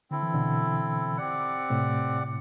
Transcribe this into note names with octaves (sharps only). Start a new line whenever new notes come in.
D3 C4 E4 A4
E3
B2 D3
C4 G4 D5 F#5
A2 C3